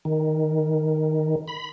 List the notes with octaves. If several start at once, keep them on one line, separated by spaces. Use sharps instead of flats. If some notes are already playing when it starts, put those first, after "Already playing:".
D#3
B5